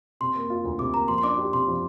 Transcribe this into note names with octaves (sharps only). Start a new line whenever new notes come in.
C3 C6
A#3
F4
D2
C3 D6
A#3 A#5
F3 C6
C6
D4 D6
G4
C3 C6
F3